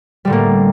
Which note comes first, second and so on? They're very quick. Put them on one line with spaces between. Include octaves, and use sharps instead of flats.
G3 D3 A2 A#3